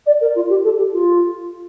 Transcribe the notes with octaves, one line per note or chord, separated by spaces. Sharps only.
D5
A#4
F4
G4
A4
G4
F4